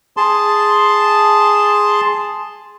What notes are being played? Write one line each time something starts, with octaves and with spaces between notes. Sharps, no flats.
G#4 A5 C6